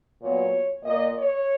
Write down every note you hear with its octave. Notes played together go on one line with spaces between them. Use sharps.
A#2 F#3 B3 C#5
A#2 A#3 D#5
C#5